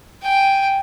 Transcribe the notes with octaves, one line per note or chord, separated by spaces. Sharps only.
G5 G#5